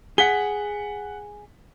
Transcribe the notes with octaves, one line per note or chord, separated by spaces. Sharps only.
G#4 F#5 B6 G7